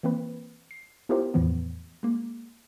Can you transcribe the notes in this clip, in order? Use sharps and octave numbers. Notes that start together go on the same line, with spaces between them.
E3 A#3 C4 B4
C7
B3 E4 F4 G4 A#4 C5
E2 A2 E3 F3 B3
G#3 A#3